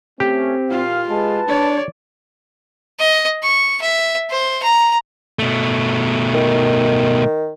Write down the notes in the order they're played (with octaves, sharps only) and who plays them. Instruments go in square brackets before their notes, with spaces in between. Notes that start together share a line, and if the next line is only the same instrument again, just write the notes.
[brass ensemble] A3 C#4 [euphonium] C4 [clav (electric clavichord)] G4
[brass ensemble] A#2 F5 [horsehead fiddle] F4
[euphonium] G#3 [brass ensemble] B4 A5
[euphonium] D4 [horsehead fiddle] C#5 D5
[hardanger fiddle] D#5
C#6
E5
C5
A#5
[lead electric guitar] B2 A3
[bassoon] D#3